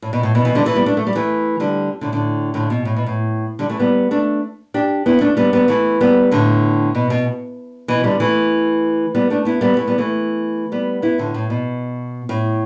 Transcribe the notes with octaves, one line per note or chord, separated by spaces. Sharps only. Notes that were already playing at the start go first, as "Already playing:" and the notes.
A2
B2
A2
B2
B2 E3
D3 G3
E3 A3
G3 B3
A3 D4
A3
G3
E3 A3
D3 G3
A2 D3
A2 D3
A2 D3
B2
A2
B2
A2
D3 G3
E3 A3
G3 B3
A3 D4
D4 G4
B3 E4
A3 D4
G3 B3
G3 B3
E3 A3
G3 B3
A2 D3
B2
B2
B2 E3
D3 G3
E3 A3
G3 B3
A3 D4
B3 E4
G3 B3
E3 A3
G3 B3
E3 A3
G3 B3
B3 E4
A2 D3
A2
B2
A2